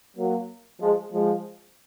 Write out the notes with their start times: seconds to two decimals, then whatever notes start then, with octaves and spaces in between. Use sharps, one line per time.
0.17 F#3 A#3
0.80 F3 G#3
1.12 F3 G#3